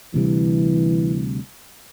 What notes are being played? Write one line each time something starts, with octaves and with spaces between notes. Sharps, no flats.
D2 C3 E3 G3